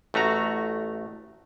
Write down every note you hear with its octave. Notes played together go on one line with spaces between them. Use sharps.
A1 A3 F#4 A#5